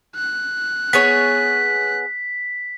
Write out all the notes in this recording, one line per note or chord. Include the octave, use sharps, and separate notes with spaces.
F#6
B3 G#4 C#5 B6